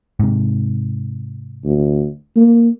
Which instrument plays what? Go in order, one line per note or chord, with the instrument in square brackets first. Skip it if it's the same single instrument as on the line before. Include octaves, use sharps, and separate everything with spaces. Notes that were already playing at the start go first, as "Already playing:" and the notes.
[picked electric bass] G#2 C3
[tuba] D2
A#3